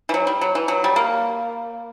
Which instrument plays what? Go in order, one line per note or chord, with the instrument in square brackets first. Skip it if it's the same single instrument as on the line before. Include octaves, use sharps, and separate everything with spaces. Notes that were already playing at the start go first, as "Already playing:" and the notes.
[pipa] E3
F#3
G3
F#3
E3
F#3
G3
A#3